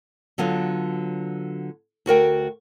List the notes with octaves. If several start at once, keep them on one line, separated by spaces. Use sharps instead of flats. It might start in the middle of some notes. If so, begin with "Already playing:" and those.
D3 F#3 B3 F4
D2 F#4 A#4 G5